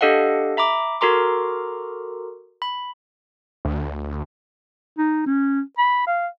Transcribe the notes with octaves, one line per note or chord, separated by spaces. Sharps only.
D4 G4 A4 D#5 F5 F#5
E5 A#5 B5 D6
F#4 A4 A#4 A#5 C6 D6
B5
D2
D#4
C#4
B5
F5